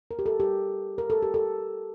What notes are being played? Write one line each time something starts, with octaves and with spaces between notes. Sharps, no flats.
A#4
G4
A4
G4
A#4
A4
G4
A4